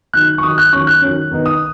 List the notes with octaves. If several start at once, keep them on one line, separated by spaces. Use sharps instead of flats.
D#3 F#3 D#4 F#6
C#6
D#3 F#3 D#4 D#6
F#6
D#3 F#3 C#4 C#6
F#6
D#3 F#3 C#4
D#3 B3 D#4
D#6